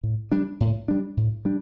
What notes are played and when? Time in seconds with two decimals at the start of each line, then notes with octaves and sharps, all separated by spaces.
0.03 A2
0.32 G3 D4
0.60 A2
0.88 G3 D4
1.17 A2
1.45 G3 D4